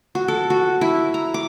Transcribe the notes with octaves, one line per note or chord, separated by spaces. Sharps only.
F#4
A4
F#4
E4
A#5
D6